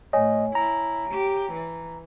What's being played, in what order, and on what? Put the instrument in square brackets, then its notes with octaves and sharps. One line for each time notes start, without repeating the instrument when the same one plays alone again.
[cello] A2 [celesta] C#5 G#5 [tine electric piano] D#5
[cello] E4 [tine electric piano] A#5
[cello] G4
E3